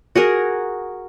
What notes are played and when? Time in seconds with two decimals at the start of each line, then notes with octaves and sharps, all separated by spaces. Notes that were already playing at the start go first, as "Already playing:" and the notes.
0.15 F#4 G#4 A#4